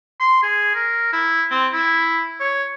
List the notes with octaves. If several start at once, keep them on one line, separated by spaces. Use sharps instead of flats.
C6
G#4
A#4
E4
C4
E4
C#5